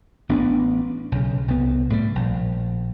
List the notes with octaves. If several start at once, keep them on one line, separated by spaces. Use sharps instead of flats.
A1 B3 D4
B1 C#3
C2 B3
A2 C3 F#3 G3
A#1